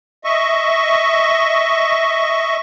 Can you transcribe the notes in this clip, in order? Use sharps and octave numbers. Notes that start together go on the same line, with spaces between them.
D#5 E5 C#6